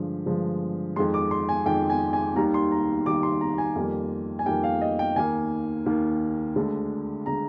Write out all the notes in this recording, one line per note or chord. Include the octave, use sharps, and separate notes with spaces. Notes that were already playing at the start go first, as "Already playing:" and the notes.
Already playing: G2 D3 F3 G#3
G2 D3 F3 G#3
F2 D#3 G#3 C6
D6
C6
G#5
F2 D#3 G#3 G5
G#5
G#5
D#2 D#3 G3 A#5
C6
A#5
D#2 D#3 G3 D6
C6
A#5
G#5
F2 D#3 G3 A#3
G#5
F2 D#3 G3 A#3 G5
F5
D#5
G5
D#2 D#3 A#3 G#5
D#2 D#3 A#3
D2 D3 G#3
D3 G#3 A#5